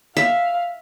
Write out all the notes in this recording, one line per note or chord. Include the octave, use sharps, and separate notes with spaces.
E5 F5